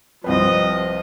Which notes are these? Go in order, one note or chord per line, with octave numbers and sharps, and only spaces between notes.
C2 F3 C4 B4 D#5